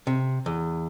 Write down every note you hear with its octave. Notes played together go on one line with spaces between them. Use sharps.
C3
E2